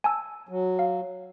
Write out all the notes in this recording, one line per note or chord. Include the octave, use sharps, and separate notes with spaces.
G#5 A5 E6
F#3
F5